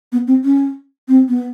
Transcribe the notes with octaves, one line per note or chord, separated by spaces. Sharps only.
B3
C4
C#4
C4
B3